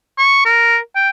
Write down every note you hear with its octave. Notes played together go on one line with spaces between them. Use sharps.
C#6
A#4
G5